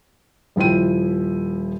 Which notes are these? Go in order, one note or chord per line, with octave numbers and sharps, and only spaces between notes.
D#1 F3 E4 G5 D#7